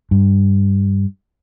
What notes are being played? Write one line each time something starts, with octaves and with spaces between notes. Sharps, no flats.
G2